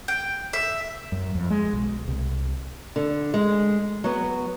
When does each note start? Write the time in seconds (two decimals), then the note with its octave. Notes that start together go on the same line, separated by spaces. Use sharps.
0.08 G5
0.53 E5
1.12 F#2
1.35 F2
1.50 G#3
1.73 B1
2.08 C2
2.96 D3
3.34 G#3
4.04 F#3 B3